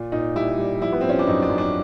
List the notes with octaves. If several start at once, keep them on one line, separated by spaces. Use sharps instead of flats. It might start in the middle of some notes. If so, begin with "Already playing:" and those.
Already playing: A#2
A#2 D#4
G3 E4
G3
F3 E4
B3
C4
F3 C#4
D4
F#2 D#4
D4
F#2
D4